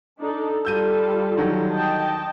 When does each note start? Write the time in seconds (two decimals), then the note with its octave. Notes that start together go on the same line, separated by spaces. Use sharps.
0.19 D4 D#4 A4
0.65 G3 F4 A4 E6 G6 D#7
1.37 D3 D#3 F#3
1.71 D#5 G5 A5